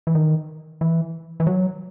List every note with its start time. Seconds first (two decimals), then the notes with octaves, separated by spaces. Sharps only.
0.07 E3
0.15 D#3
0.81 E3
1.40 E3
1.47 F#3